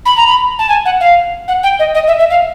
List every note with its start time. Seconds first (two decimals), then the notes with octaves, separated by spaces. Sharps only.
0.06 B5
0.17 A#5
0.28 B5
0.59 A5
0.69 G#5
0.85 F#5
1.00 F5
1.48 F#5
1.63 G5
1.79 D#5
1.95 D#5
2.07 E5
2.19 E5
2.30 F5